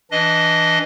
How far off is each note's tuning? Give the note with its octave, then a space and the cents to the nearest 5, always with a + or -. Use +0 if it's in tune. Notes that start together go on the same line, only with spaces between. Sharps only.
E3 +0 D4 +0 D#5 +0